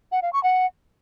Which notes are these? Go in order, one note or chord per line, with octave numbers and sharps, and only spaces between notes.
F#5
F5
C#6
F#5